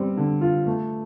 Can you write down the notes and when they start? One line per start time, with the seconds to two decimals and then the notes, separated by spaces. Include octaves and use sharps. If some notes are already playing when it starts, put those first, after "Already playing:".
Already playing: G3 C4
0.17 D3
0.41 F4
0.67 A3